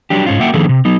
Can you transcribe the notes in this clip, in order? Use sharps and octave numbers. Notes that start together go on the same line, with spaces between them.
F#3 G3 D4 G4
G#2 C#4 F4
A#3 F#4 E5 F#5 G5
D#3 F3 A#3 D4 G#4 A4
C3
F#3 B3 D#4